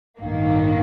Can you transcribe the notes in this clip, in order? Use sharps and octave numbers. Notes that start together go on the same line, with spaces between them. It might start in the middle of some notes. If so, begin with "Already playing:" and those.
A1 G2 D#3 A#3